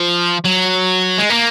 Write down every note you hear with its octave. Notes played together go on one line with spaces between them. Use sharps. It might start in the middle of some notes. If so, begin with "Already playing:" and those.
Already playing: F3
F#3
G#3
A#3